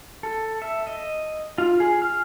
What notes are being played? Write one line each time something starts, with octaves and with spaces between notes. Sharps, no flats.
A4
E5
D#5
F4
G#4
F6